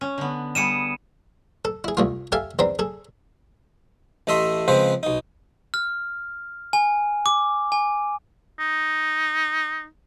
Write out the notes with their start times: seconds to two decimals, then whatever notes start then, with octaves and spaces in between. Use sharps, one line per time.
0.01 C#4
0.18 D3 B3
0.55 G3 B3 G#4 C#7 D#7 E7
1.65 A4
1.84 E4 G#4
1.97 C2 A3 F4
2.32 G4 A4 E5 F5 G#5 A5
2.59 E2 C4 D4 A#5 B5
2.79 G#4 A4
4.27 A1 A3 D#5 E5 C6
4.68 C#3 F3 G#3 C4 B4 C5
5.03 B1 D#4
5.74 F6
6.73 G#5
7.26 D6
7.72 G#5
8.59 D#4